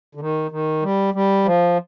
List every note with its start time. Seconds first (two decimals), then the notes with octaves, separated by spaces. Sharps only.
0.15 D3
0.21 D#3
0.51 D#3
0.82 G3
1.14 G3
1.45 F3